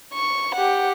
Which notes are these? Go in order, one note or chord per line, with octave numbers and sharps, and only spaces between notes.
C#6
G4 F#5